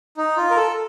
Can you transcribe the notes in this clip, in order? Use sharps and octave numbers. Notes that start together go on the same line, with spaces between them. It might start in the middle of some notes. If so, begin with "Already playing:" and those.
D#4
F4
A#4
A4